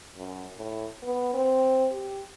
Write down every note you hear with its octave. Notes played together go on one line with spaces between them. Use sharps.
F#2
A2
B3
C4
G4